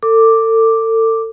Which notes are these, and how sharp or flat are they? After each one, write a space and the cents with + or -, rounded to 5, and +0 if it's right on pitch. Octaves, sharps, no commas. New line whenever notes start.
A4 +35 D6 +0